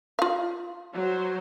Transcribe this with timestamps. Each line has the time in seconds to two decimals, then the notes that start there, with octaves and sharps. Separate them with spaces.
0.19 F4 F5
0.94 F#3 C5